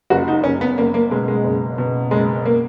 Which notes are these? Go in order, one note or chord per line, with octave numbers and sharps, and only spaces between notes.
F#1 F#4
D#4
F#1 C#4
B3
F#1 A#3
A#3
B2 G#3
G#3
F#1
B2
F#1 G#3
A#3